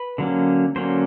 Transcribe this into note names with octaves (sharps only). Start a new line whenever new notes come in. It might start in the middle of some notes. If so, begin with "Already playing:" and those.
Already playing: B4
D3 F#3 A#3 C#4
D3 F#3 A#3 C#4 C5